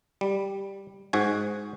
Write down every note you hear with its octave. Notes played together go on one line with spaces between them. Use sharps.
G3
G#2 F#4 G#5